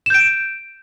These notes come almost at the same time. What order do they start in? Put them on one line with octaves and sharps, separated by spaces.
E7 G6 D7